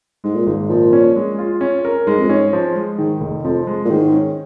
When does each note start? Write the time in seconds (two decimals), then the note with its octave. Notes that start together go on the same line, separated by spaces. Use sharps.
0.24 G#2 G#3
0.35 A#2
0.47 G#1 G#2
0.69 A#2 F3
0.93 C#4
1.16 G#3
1.39 F4
1.61 C#4
1.85 A#4
2.07 G#2 G#3
2.18 F2
2.29 G#2 C#4
2.53 F3
2.76 G#3
2.99 G#2 D#3
3.21 F1
3.44 F2 F3
3.67 G#3
3.85 A#2
3.90 G#2 D#3
4.12 C#4